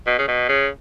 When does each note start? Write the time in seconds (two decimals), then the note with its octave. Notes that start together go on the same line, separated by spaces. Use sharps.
0.07 B2
0.19 C#3
0.28 B2
0.49 C#3